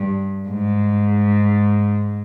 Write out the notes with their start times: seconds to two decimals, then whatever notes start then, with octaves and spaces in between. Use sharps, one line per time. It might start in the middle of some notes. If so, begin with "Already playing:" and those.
Already playing: G2
0.47 G#2